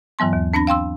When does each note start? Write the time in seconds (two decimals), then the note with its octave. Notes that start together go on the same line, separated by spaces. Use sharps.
0.19 G2 E3 F#3 B3 C6
0.33 D#2
0.54 C4 D4 B5 A#6
0.67 F5 G5 C6 E6